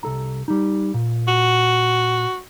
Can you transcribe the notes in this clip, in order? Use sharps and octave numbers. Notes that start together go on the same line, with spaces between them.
C2 A4 A#5
G3 D#4
A#2
F#4